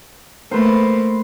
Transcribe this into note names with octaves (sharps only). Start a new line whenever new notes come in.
A3 A#3 B4 C5